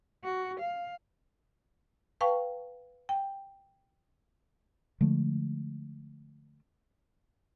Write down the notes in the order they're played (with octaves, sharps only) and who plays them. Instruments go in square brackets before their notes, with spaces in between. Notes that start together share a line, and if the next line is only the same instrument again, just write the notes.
[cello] F#4
F5
[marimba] B4 F5 G5 A5 C#6
G5
[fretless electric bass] D3 F3 G#3 A3